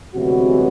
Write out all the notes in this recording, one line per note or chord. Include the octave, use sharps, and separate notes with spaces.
D2 C3 E3 F#3 G#3 B3 F#4